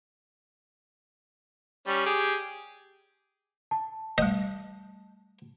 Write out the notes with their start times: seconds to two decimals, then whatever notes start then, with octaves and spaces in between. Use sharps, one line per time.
1.87 G3 C#4
2.06 G4 G#4
3.71 A5
4.18 G3 A3 D#5